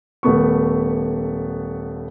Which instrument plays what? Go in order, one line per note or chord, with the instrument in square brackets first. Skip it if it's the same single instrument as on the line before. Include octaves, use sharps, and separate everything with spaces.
[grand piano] D#1 A3 B3 C#6